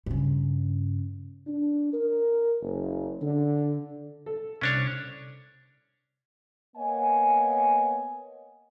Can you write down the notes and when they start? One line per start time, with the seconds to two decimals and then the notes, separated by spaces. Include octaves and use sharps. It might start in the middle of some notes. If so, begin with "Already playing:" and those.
0.06 G2 C#3
1.47 D4
1.93 A#4
2.62 F#1
3.22 D3
4.26 A4
4.61 C2 C#4 D4 C#5
6.77 A#3 B3 C#5 D#5 F#5 G#5